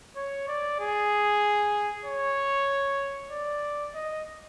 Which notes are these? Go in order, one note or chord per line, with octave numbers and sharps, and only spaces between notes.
C#5
D5
G#4
C#5
D5
D#5